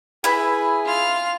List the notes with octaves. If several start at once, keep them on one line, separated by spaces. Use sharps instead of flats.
E4 G#4 B4
F4 F6